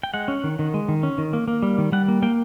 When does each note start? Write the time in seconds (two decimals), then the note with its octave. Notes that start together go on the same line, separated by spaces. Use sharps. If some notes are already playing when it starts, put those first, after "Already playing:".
0.03 G5
0.14 G#3 F#5
0.28 C#4
0.44 D#3
0.59 D#3
0.74 G#3
0.89 D#3
1.03 C#4
1.18 D#3
1.33 A#3
1.48 A#3
1.63 G3
1.78 D#3
1.92 G3 F#5
2.08 A#3
2.22 A#3 G5